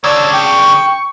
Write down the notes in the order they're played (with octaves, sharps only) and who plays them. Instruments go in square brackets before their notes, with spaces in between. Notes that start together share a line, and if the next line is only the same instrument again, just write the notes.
[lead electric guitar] C#3 D4 [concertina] C#5 E6 [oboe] D5
[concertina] G5 [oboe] C#6